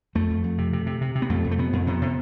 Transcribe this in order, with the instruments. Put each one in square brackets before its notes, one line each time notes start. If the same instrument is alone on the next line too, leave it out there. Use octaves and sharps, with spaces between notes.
[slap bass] F2 A3
F2
F2
C3
C3
C3
C3
C3
B3
F2 A3
F2
A3
C3 B3
F2
C3 B3
C3